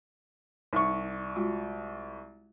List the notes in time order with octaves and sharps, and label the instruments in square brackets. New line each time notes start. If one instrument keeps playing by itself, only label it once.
[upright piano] C2 C#6 [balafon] D#4
[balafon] G#3 F4 F#4